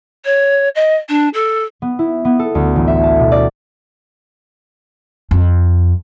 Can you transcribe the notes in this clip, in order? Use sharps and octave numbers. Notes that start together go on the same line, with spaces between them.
C#5
D#5
D4
A4
B3
E4
B3
A4
D2
A1
E5
A5
B2
D5
F2